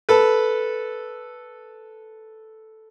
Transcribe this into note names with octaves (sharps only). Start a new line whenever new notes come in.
A4 B4